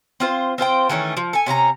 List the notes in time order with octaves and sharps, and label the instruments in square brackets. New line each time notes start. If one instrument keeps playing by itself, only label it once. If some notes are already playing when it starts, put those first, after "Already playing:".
[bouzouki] C4 F4 C5
C4 F4 C5 G5
D#3 E3 A3 C#4
F3
A4 G#5
C3 C#4 F4 A#5